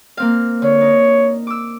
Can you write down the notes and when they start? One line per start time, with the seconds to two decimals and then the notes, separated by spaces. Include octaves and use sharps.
0.17 A#3 C4 F5
0.62 D3 C#5
0.81 D#4
1.47 D6 E6